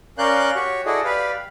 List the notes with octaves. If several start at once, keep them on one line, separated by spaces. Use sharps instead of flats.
C#4 A#4 D5 F5 F#6 G6
F#4 G4 C#5
E4 F#4 G#4 A4 D5 D#5
G4 B4 D5 F5